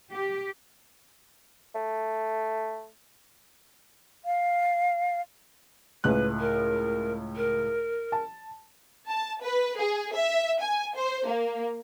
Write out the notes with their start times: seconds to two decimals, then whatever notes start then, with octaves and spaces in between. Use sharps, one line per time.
0.12 G4
1.75 A3
4.25 F5
6.04 C#2 A2 B4 F#6
6.39 A#4
7.36 A#4
8.12 A5
9.08 A5
9.42 B4
9.78 G#4
10.14 E5
10.62 G#5
10.95 C5
11.27 A#3